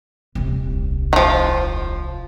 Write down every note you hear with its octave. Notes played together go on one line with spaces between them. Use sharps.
D#1 C2
D#3 F3